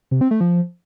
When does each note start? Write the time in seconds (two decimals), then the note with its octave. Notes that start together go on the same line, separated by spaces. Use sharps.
0.11 C3
0.21 C4
0.31 A3
0.41 F3